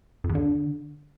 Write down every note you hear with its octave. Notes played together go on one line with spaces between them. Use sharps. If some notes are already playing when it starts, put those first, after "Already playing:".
F2
E2
D3